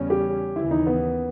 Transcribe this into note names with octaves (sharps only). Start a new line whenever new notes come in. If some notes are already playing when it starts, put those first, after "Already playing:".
Already playing: E2 C#3 G3 C#4
G4
D#2 C#3 E3 E4
D#4
B3